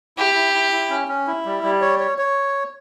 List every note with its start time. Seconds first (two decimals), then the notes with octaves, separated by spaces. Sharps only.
0.17 E4 G4
0.35 E4
0.54 E4
0.72 E4
0.90 C#4
1.08 C#4
1.27 E4
1.45 G3
1.63 G3
1.81 C#5
2.00 C#5
2.18 C#5